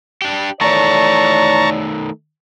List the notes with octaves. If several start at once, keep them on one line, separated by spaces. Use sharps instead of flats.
D4 G4
D#3 E3 A3 C#5 D5 A5 A#5 C#6